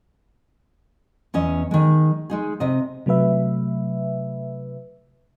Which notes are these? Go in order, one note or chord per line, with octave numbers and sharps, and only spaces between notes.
E2 C#4 D#5
D#3 G#3
G#3 D#4 G#4
C3 D#5
C3 F#3 A3 B4 E5